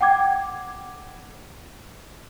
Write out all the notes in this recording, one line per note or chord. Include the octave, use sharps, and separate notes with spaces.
F#5 G5 D6 G#6